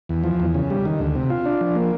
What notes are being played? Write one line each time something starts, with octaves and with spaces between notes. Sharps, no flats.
E2
F3
E2
C#3
G3
D#3
D2
C3
F4
D4
F3
A#3